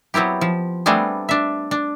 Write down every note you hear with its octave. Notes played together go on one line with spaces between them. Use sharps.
F#3 B3 C4 E4 G4
F3
G3 A3 B3 C4 D4 G#4
D4 E5
D4